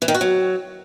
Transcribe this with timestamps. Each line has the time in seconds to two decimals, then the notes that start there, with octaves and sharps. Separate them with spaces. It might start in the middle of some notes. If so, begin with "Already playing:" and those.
0.02 E3
0.08 D#3
0.14 F#4
0.21 F#3